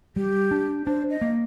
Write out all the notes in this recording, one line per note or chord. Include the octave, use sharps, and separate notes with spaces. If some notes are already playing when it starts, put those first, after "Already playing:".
G3 G4
D4
D4 C5
D#5
A#3